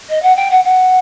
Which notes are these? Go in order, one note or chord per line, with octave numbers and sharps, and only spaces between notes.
D#5
F#5
G5
F#5
F#5